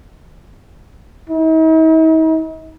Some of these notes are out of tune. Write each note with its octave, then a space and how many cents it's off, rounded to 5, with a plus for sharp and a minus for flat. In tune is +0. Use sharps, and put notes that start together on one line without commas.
D#4 +45